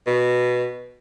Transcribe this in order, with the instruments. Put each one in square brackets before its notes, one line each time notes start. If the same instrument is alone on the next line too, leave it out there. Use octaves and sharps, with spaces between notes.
[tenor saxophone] B2